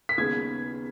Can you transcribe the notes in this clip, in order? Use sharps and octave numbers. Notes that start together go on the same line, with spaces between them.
B6
D#2 C#3 G#3 B3 G#6